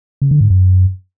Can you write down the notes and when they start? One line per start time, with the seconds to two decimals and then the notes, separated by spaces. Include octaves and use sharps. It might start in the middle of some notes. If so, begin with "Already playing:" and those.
0.22 C#3
0.31 D3
0.41 G#2
0.50 F#2